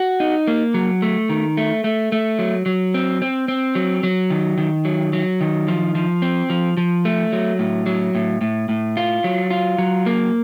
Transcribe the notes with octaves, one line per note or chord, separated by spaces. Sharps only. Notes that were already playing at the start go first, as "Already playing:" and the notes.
Already playing: F#4
D#4
A#3
F#3
A3
D#3
A3
A3
A3
F#3
F#3
C4
C4
C4
F#3
F#3
D#3
D#3
F#3
F#3
D#3
F3
F3
C4
F3
F3
A3
F#3
A2
F#3
A2
A2
A2
F4
F#3
F4
F#3
A#3